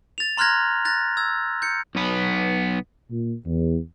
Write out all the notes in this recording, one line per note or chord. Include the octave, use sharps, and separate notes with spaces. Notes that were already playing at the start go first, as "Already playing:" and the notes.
A6 F7
A#5 C6 F6 F#6 G#6 A#6
F#6 A6 A#6
E6 G#6
G6 C#7
B1 B3
A#2
E2